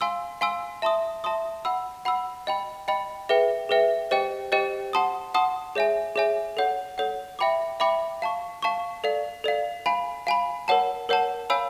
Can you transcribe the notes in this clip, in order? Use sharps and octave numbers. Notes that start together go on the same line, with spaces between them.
F5 G#5 C6 E6
F5 G#5 C6 E6
E5 A5 C6 D#6
E5 A5 C6 D#6
F#5 B5 E6
F#5 B5 E6
D#5 G5 B5
D#5 G5 B5
G#4 B4 E5 G5
G#4 B4 E5 G5
G4 C5 D#5 G5
G4 C5 D#5 G5
F#5 A5 C6 D#6
F#5 A5 C6 D#6
G#4 C#5 E5 G#5
G#4 C#5 E5 G#5
A4 C#5 F#5
A4 C#5 F#5
E5 G5 B5 D6
E5 G5 B5 D6
F5 A5 C#6
F5 A5 C#6
A4 D5 F5
A4 D5 F5
F5 G#5 B5
F5 G#5 B5
A#4 C#5 F#5 A5
A#4 C#5 F#5 A5
C#5 F5 G#5 B5 E6